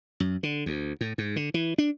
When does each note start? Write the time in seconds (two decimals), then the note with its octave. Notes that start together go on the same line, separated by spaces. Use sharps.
0.20 F#2
0.43 D3
0.66 D2
1.01 A2
1.18 G#2
1.36 D3
1.54 E3
1.78 D4